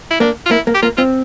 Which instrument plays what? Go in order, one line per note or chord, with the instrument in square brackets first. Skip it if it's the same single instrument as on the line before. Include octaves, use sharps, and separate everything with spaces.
[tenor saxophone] E4
[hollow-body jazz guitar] A#3 [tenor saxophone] D4
[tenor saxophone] F4
[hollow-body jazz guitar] A#3 [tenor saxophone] E4
[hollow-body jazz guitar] A#3
[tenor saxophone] G4
[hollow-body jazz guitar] A#3 [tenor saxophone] F4
[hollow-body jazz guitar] C4 [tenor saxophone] F4